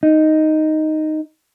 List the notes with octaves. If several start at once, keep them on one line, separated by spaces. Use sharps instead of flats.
D#4